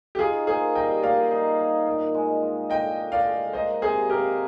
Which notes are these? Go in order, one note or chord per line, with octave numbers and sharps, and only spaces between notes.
G4
D#4 F4 G#4
A#3 G#4 C5
G3 D#5 G5
A#3 D5 F5
D#4
D#4
A#2
G#3
F4
D4 D#5 G5
D4
D5 F5
G#3
A#3 C5 D#5
C3 G#4 C5
A#3 G4 A#4